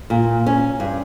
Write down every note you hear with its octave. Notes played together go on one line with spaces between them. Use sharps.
A#2
C#4
G2